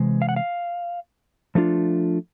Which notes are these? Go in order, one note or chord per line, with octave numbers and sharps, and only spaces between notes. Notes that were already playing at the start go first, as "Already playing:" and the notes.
Already playing: C3 E3 G#3
F5
F#5
F5
F3 A3 D4 F4